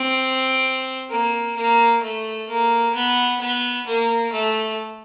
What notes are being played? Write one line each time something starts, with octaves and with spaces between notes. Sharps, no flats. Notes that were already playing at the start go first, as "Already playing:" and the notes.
Already playing: C4
A#3
A#3
A3
A#3
B3
B3
A#3
A3